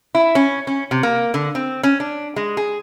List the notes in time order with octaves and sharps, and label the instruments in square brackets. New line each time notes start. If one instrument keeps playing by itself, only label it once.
[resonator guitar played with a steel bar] E4
C#4
C#4
C3
A#3
D3
C4
C#4
D4
G#3
G#4